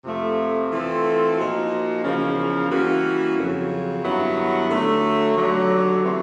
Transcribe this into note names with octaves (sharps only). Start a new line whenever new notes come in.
F2 C3 F3 A3
E3 A3 C4 F4 A4
A#2 F3 A#3 D#4 F#4
E2 C#3 F3 A#3 C#4
E3 G3 A#3 C#4 F#4
F2 C#3 F#3
G2 D#3 F#3 B3 E4
D3 F#3 A3
D#2 D3 F#3
C3 E3 A3 C4